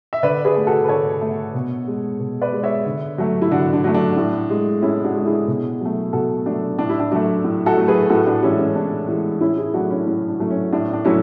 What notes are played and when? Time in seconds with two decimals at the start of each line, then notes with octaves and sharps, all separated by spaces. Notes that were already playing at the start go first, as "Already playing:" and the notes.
0.13 E5
0.23 D3 B4 D5
0.45 G#4 B4
0.56 A3
0.67 F#4 A4
0.84 B4
0.88 D3 A4 C#5
1.21 A3
1.55 B2
1.87 G#3
2.20 B2
2.42 B4 D5
2.53 G#3
2.63 C#5 E5
2.86 D3
3.18 F#3 A3
3.42 E4
3.51 D3 D4 F#4
3.73 D4
3.84 F#3 A3
3.94 D4
4.17 A2
4.50 G#3
4.82 A2 C#4 E4
5.04 D4 F#4
5.15 G#3
5.26 E4 G#4
5.48 B2
5.81 F#3 A3
6.13 B2 F#4 A4
6.46 F#3 A3 D4
6.79 A2 D4
6.89 E4
7.00 D4
7.11 F#3 A3 D4
7.44 A2
7.66 F#4 A4
7.77 F#3 A3
7.88 G#4 B4
8.10 A2 F#4 A4
8.26 D4 F#4
8.43 E3 G#3 C#4 E4
8.59 C#4
8.75 A2 D4
9.08 E3 G#3 D4
9.41 A2 C#4 E4
9.58 E4 G#4
9.74 F#3 A3 D4 F#4
9.90 C#4 E4
10.07 A2 C#4
10.28 D4
10.40 F#3 A3
10.50 C#4
10.72 A2 D4
10.93 D4
11.05 F#3 A3 C#4 E4